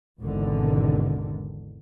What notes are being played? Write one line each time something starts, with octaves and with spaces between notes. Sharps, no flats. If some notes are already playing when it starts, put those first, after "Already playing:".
G#1 E2 G#2 B2 D3 D#3